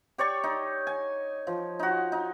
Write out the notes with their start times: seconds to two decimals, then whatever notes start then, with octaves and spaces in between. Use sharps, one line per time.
0.18 G4 C#5 D5 C#6
0.44 D#4
0.87 G#5
1.47 F3
1.79 D#4 F#4
2.12 D#4